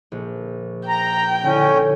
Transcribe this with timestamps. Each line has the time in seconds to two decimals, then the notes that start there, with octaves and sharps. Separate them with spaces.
0.12 A#1
0.89 G5 A#5
1.43 D3 C#4 E4